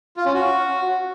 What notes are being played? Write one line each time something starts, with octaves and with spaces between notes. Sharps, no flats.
F4
C#4
F#4